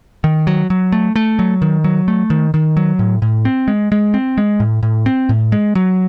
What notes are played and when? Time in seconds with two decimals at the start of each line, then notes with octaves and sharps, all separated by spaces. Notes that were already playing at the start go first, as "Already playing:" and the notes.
0.24 D#3
0.47 F#3
0.70 F#3
0.92 A3
1.16 A3
1.39 F#3
1.62 D#3
1.84 F#3
2.08 A3
2.30 D#3
2.54 D#3
2.77 F#3
2.99 A2
3.22 A2
3.45 C4
3.68 G#3
3.92 G#3
4.14 C4
4.38 G#3
4.60 A2
4.83 A2
5.06 C4
5.29 A2
5.52 G#3
5.75 F#3